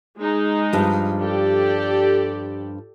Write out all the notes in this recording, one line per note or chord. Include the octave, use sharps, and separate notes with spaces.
G#3 D#4
G2 F3
G4 A4 D5